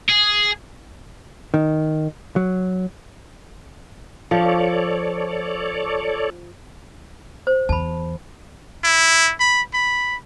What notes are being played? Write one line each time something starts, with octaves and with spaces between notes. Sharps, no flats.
G#4
D#3
F#3
F3 A4 C#5 D5
C5
E2 A5 B5
E4
B5
B5